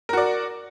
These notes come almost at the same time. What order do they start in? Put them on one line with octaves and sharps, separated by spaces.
A#4 F#4 D5